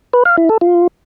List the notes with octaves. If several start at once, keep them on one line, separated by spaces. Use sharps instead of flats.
B4
F5
E4
A4
F4